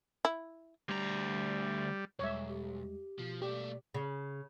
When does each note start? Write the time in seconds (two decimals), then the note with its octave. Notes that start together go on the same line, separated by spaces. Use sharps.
0.25 E4
0.88 D2 G3 A#5
2.19 B1 E2 G3 G#3 C#5 E5
2.48 G4
3.19 B2 F3
3.42 A3 A#3 G4 D5
3.94 C#3